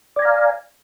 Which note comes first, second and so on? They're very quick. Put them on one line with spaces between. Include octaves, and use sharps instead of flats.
D5 G#5 A#5 F5